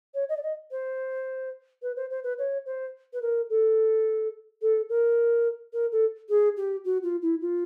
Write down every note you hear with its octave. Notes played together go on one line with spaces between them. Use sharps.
C#5
D#5
D5
D#5
C5
B4
C5
C5
B4
C#5
C5
B4
A#4
A4
A4
A#4
A#4
A4
G#4
G4
F#4
F4
E4
F4